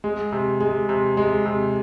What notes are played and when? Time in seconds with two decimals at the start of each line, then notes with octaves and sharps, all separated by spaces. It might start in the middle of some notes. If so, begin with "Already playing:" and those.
0.04 G#3
0.32 C3
0.60 G#3
0.89 C3
1.17 G#3
1.45 C3